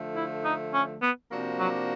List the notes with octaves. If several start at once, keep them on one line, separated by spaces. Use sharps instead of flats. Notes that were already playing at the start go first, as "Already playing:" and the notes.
Already playing: D3 F3 A3
E4
D#4
C#4
B3
C3 F3 A#3 D4 F#4
F#3